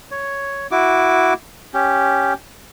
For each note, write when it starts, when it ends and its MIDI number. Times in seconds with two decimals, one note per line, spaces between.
0.11 0.67 73
0.71 1.34 64
0.71 1.34 66
0.71 1.34 86
1.74 2.34 61
1.74 2.34 67